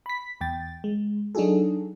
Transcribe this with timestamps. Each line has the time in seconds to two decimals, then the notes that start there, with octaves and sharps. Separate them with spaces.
0.06 B5 B6
0.41 E2 G5 A6
0.84 G#3
1.35 F#3 D4 D#4 F#4 G#4 A4